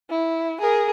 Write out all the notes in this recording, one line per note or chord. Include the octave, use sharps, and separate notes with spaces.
E4
G#4 A#4